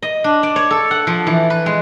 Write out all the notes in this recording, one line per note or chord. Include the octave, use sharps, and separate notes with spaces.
D#5
D4
D5
C#5
A4
F#5
F3
E3
B4
G#3